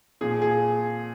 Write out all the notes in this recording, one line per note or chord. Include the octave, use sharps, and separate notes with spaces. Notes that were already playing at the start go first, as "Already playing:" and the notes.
A#2 F3 G#4
G#4